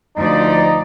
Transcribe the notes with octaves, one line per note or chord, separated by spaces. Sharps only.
D2 F3 D#4 D5